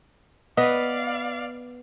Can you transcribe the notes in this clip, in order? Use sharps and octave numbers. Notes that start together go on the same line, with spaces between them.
B3 B4 D5 D#5 F5